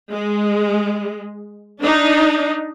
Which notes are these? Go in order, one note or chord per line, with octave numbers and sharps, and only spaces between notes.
G#3
D4 D#4